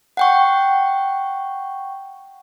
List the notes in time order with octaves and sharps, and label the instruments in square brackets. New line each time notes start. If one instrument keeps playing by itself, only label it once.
[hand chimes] F#5 G5 C#6